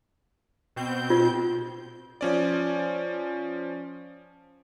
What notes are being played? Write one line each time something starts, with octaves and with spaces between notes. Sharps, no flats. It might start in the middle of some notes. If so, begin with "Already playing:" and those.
B2 C4 G6
F4
F3 C#4 D5